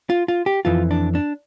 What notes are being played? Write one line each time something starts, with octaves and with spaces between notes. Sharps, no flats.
F4
F4
G4
F2 E3 F4
D4
D4